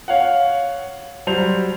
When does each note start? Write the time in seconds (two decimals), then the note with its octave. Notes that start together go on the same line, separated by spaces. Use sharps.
0.08 C#5 F5 F#5
1.27 F#3 G3 C5 F7